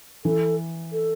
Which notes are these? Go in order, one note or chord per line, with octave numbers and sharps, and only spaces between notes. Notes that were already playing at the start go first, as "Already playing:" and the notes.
E3 A4
A4